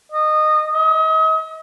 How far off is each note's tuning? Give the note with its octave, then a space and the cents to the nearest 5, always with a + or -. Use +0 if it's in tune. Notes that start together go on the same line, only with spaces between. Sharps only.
D#5 -20
D#5 +40